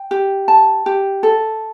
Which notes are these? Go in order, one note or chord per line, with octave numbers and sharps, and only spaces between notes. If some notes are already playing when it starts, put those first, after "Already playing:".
Already playing: G5
G4
A5
G4
A4